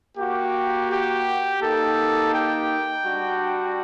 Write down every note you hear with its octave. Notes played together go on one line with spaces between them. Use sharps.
A#3 F#4 G4
G4
A#3 D#4 G4 A4
G5
G3 D4 F#4